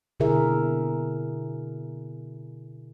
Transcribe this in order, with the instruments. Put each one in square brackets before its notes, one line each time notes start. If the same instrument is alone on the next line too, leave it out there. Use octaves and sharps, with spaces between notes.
[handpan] B2 D3 E4 G#4 A#4 E5